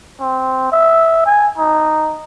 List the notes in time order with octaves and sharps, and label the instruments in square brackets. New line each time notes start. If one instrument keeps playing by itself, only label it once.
[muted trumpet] C4
E5
G#5
D#4